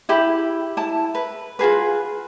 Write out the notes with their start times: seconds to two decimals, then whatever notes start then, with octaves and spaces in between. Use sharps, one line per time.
0.09 E4 G4 B5
0.77 E4 A5
1.15 B4
1.59 F4 F#4 G#4 B4